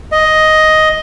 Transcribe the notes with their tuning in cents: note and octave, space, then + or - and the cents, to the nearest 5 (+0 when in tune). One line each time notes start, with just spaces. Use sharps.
D#5 +5